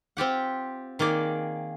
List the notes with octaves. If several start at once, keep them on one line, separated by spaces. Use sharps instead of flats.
C4 F4 G4 F#5
D#3 A#3 G#4 D5